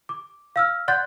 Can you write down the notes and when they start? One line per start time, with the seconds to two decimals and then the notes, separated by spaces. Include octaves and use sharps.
0.09 D6
0.56 F5 E6 F6
0.88 D5 F#5 C6 F#6 G6 A6